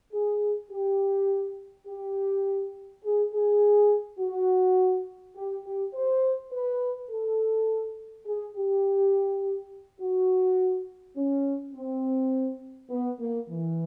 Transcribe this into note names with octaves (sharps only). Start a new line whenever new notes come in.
G#4
G4
G4
G#4
G#4
F#4
G4
G4
C5
B4
A4
G#4
G4
F#4
C#4
C4
B3
A#3
E3